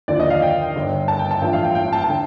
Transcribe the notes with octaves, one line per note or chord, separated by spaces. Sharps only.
D#2 D3 F3 D5
D#5
F5
G5
G1 G2 D3
A5
G5
A5
A1 G2 F3 A3 G5
F5
G5
G5
A5
A5
D3 G5